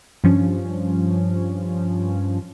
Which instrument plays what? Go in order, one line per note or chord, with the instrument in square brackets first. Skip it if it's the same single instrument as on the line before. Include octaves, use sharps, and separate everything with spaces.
[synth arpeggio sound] G2 F3 C#4